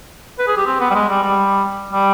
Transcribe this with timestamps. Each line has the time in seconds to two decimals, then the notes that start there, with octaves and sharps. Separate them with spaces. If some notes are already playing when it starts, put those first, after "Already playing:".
0.39 B4
0.47 G#4
0.57 G4
0.66 C4
0.80 B3
0.91 G3
0.95 G#3
1.09 G3
1.23 G3
1.93 G3